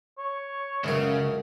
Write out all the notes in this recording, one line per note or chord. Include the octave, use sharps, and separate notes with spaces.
C#5
C#2 F#2 C#3 C#4 G#4